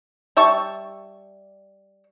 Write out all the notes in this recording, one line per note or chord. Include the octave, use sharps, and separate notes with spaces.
G3 E5 A5 C#6